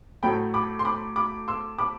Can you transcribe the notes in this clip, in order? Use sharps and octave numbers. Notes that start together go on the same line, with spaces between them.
A2 F#3 A3 G5 B5
B5 D6
C6
B5 D6
B5 D6
C6 E6
B5 D6